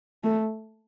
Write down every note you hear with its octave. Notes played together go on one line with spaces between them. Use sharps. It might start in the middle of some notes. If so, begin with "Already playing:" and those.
A3